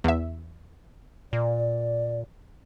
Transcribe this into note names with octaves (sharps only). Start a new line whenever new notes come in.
E2 E5
A#2 D5